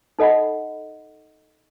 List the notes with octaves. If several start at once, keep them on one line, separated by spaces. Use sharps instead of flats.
D#4 A4 D#5 F#5 B5